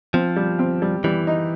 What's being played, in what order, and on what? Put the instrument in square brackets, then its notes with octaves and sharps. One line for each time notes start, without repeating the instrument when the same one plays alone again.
[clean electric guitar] F3 [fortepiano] C4
[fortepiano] G3
C4
G3
[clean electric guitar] E3 [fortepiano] G3
[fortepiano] D#4